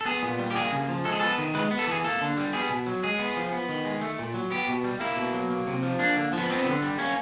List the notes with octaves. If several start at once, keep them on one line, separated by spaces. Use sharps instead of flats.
A4
B3 G#4
A#2
G3
G4
A#3 G#4
C#3
F3
G#3 A4
G#4
B3 A4
D#3
G#3 B4
B3
A4
E3 G#4
A#3 A4
D3
G3
B3 G#4
B2
F#3
G#3 G#4
B3
F3
B3
D#3
G#3
A3
A#2
F#3
B3 G4
B2
G3
A#3 E4
B2
F#3
A#3
C3
F3
A#3 D4
D3
F3 B3
B3 C4
D3
G3
A#3 C#4